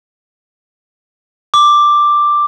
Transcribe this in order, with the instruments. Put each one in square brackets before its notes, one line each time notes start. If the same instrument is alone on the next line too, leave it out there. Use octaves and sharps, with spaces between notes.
[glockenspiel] D6